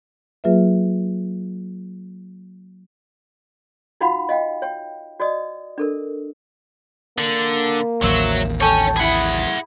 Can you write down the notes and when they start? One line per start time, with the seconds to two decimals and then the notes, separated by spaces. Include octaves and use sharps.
0.44 F#3 A#3 F4 G#4 B4 E5
4.01 D#4 F4 F#4 F5 F#5 B5
4.29 D#5 F5 G5
4.62 C#5 G5
5.20 F#4 D5 D#5 D#6
5.78 D4 A4 A#4
7.18 D3 A#3
8.03 A1 D#2 F#3 C5 E5
8.61 A4 C#5 G5 G#5 C#6
8.97 E4 G#4 F#5 B5